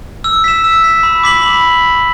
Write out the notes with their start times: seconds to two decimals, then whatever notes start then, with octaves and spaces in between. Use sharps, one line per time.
0.24 E6
0.44 B6 E7
0.64 E6
0.84 B6 E7
1.03 B5
1.23 D6 B6 F#7
1.43 B5